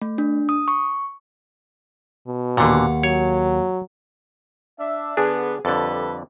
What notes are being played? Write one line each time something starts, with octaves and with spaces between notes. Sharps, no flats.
A3
D4
D#6
C#6
B2
D#2 A#2 D3 F5 F#5
F#3 C#5
D4 E5
D3 B3 D4 G#4
F2 D3 G3 A4 B4 A6